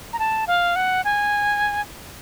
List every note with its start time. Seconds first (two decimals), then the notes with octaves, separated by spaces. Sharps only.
0.13 A#5
0.19 A5
0.47 F5
0.76 F#5
1.05 G#5